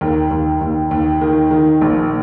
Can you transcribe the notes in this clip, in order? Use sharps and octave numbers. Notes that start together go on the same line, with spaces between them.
D#2 A#4
D#2
D#2
D#2
D#3
D#3
A#1